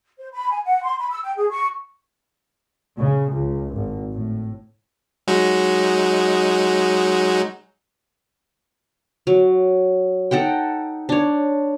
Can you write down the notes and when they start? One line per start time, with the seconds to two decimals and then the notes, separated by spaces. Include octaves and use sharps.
0.19 C5
0.33 B5
0.51 G#5
0.64 F#5
0.83 C6
0.99 B5
1.10 E6
1.24 G5
1.37 G#4
1.50 C#6
2.99 C#3
3.31 C#2
3.74 G#1
4.13 A2
5.28 F#3 G#3 D#4
9.27 F#3
10.31 D#4 A4 F#5 G5
11.09 D4 C#5